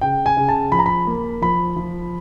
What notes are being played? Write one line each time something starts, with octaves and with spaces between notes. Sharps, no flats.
C#3 G5
G#5
C#3
A5
F3 B5
A#5
B5
A#3
F3 B5
F3